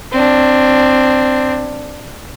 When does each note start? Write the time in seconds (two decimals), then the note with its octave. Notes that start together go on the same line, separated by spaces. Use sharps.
0.12 C4 D4